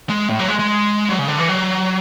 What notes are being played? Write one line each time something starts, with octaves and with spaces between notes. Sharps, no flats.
G#3
A2
F#3
G#3
G#3
F#3
C#3
D3
E3
F#3